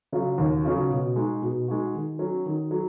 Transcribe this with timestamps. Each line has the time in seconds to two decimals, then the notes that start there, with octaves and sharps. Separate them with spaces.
0.12 C#3 F#3 C#4 F4
0.38 D#2
0.65 C#3 F#3 C#4 F4
0.90 B2
1.16 G#3 D#4 F#4
1.42 B2
1.68 G#3 D#4 F#4
1.94 D#3
2.19 F#3 C#4
2.46 D#3
2.71 F#3